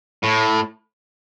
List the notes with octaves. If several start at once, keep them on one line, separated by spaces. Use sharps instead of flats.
A2